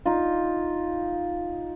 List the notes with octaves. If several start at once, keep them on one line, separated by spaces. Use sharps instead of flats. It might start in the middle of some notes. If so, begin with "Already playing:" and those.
D#4 F4